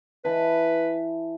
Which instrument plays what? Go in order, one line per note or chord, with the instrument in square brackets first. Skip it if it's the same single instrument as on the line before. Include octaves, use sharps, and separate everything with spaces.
[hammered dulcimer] E3 A5 [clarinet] B4